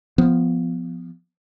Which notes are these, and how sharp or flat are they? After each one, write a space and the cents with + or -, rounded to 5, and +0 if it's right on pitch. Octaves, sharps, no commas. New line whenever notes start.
F3 +0 B3 +10